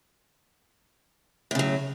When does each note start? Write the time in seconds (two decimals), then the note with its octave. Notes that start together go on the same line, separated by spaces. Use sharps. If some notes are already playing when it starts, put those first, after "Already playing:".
1.51 A2
1.55 C#3
1.59 F#3